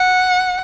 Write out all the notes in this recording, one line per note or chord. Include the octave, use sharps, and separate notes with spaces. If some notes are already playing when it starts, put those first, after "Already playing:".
Already playing: F#5